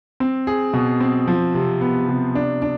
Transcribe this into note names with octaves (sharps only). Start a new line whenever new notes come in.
C4
G#4
B2
C4
F3
C3
B3
C3
D4
D4